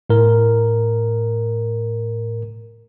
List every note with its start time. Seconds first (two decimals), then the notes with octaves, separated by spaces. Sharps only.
0.10 A2 A#4